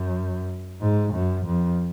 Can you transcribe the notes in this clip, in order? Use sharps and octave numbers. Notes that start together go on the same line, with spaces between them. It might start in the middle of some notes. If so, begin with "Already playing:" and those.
Already playing: F#2
G#2
F#2
F2